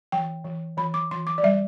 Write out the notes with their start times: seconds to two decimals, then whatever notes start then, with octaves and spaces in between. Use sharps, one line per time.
0.12 E3 G5
0.45 E3
0.77 E3 B5
0.94 D6
1.11 E3 C6
1.27 D6
1.38 D5
1.43 G3 E5